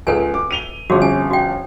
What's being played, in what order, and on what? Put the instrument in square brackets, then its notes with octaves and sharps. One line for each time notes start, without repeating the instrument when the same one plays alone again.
[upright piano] C#2 [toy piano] A4 B4 G#5
[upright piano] D6
D#7 F7 G7
[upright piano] G1 F2 C#4 [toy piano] F#4 G#4
[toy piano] G#5
F#4 G5